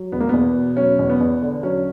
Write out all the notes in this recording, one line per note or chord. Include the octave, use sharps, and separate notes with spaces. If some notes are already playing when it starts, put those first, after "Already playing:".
Already playing: F#3
E2 B3
A#3
E2 B3
B2
F#3 C#4
E2
B3
E2
D3
F#3 C#4